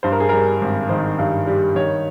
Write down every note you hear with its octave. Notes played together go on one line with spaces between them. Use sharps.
G2 C5
A#4
G#4
G3 A#4
G#1
D#3 C5
G2
G3
D#3 C#5